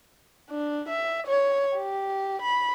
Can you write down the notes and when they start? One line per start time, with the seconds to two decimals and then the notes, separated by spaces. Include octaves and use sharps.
0.50 D4
0.89 E5
1.27 C#5
1.75 G4
2.42 B5